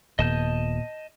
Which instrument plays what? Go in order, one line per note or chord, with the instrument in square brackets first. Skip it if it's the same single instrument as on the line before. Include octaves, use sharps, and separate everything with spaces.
[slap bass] D#1 D#2 [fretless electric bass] A#2 B3 [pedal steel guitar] D#5 A5 G6